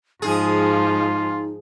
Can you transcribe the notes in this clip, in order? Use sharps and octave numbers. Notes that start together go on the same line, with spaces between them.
G#2 F3 G#3 D#4 F4 G#4